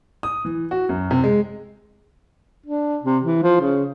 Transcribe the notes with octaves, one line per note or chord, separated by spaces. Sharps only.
D#6
E3
F#4
F#2
C3
G#3
D4
C3
E3
F3
C#3